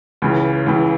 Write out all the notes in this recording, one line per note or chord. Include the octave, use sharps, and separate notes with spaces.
C#2 C#3 E3
C#2 C#3 E3